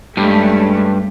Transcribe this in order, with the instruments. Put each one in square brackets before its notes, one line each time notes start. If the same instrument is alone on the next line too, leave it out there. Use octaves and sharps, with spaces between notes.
[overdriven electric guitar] G2 [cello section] G#3 A3 C#4